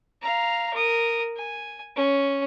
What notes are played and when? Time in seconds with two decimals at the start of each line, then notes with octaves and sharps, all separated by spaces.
0.22 F5 A#5
0.73 A#4 D#6
1.37 G#5
1.96 C#4